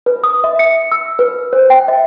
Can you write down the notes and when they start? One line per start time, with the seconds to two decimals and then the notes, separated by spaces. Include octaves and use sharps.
0.06 B4
0.24 D#6
0.44 E5
0.59 C#7
0.92 E6
1.19 B4
1.53 C5
1.70 G5
1.88 E5